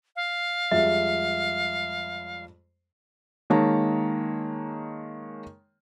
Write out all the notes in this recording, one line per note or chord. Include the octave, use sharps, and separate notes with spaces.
F5
F2 G3 G#3 E5
D#3 G#3 A#3 C#5 A5 A#5